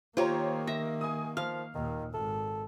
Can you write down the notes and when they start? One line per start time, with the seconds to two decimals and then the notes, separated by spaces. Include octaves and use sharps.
0.17 D#3 A#3 F4 G4 C5 C#5 A#5
0.67 E5 A#6
1.01 G#5 D#6
1.37 F3 F5 F6
1.75 D#2 A#2 D#3
2.14 G#1 A4